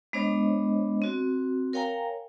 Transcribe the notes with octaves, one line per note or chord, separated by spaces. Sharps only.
G#3 B3 D4 C5 C#5 D#5
C4 F#4
A#4 C#5 F5 G5 G#5 A#5